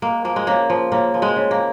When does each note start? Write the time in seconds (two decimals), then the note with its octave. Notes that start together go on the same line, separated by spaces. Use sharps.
0.02 G#3 A#3
0.24 F3 A#3
0.36 G#3
0.47 C#3 A#3
0.70 F3
0.92 C#3 A#3
1.14 F3
1.22 G#3
1.36 C#3
1.51 A#3